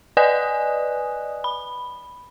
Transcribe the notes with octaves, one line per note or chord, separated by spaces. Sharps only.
B4 D5 D#5 G#5 D#6 F#6
B5